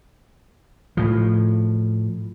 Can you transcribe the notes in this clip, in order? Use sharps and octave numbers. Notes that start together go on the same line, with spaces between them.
A2 F3